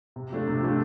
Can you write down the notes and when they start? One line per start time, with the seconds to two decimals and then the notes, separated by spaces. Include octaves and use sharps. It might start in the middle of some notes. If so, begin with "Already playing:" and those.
0.16 C3
0.31 F3 A3 D4 A4
0.47 C3
0.62 F3 A3 D4 A4